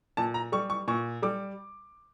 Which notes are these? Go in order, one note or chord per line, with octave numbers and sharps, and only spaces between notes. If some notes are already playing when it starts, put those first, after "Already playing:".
A#2 A5
A#5
G3 C#6
C#6
A#2 C#6
G3 D6